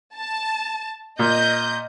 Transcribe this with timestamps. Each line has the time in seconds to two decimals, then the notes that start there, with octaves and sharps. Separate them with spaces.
0.17 A5
1.19 A#2 D#5 G6